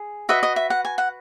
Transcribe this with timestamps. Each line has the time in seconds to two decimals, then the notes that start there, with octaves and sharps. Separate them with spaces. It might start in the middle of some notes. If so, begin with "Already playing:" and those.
Already playing: G#4
0.29 F#4 B4 D#5 E5
0.43 D#5
0.56 E5
0.70 F#5
0.85 G#5
0.98 F#5